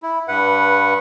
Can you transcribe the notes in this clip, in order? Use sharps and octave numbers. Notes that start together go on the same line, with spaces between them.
E4
G2 B4 F#5